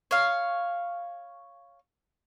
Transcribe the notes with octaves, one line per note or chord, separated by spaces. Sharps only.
C#5 F5